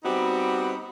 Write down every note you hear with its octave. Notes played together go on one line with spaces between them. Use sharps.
G3 B3 C4 D#4 F#4 G4